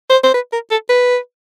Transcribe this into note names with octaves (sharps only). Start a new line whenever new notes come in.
C5
C5
B4
A#4
A4
B4